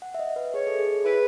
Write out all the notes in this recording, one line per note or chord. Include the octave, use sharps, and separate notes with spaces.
F#5
E5
D#5
B4
G#4 C#5
A4
G#4
G#4
E4 G#4 B4